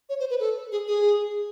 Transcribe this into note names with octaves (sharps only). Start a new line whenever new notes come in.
C#5
C5
B4
A4
G#4
G#4